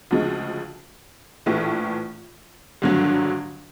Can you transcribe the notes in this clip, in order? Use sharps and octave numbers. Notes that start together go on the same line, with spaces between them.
D2 C#3 F3 G#3
A#1 A2 E3 A3
G#1 G2 D3 F#3